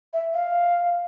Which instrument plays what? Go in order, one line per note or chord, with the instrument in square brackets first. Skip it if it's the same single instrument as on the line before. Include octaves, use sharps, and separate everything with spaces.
[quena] E5
F5